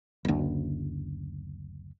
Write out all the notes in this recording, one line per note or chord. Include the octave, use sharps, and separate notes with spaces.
F#1 D2